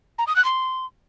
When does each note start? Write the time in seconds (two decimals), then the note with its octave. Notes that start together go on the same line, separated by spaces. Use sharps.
0.18 A#5
0.27 D#6
0.36 F#6
0.45 C6